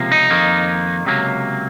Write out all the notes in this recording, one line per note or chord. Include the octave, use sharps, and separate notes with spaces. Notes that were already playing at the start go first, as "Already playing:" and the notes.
Already playing: C#2 C3 F3 A#3
D#4
F2 D#3 A#3
C#2 C3 F#3 A#3